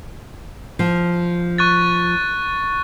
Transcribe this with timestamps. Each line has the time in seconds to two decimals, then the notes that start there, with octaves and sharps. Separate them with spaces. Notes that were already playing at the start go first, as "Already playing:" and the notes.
0.79 F3
1.58 C#6 F#6 A6